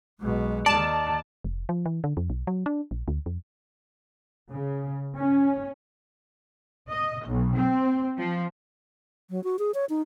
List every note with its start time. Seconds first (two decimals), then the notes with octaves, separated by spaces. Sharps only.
0.20 B1 B2 G#3
0.66 D#2 D#3 D5 A5
1.44 F1
1.69 F3
1.86 E3
2.04 D3
2.17 F2
2.30 B1
2.47 F#3
2.66 D4
2.91 A#1
3.08 D2
3.26 F2
4.52 C#3
5.18 C#4
6.92 D#5
7.26 B1
7.56 C4
8.18 F3
9.30 F#3
9.44 F#4
9.59 G#4
9.74 C#5
9.89 D#4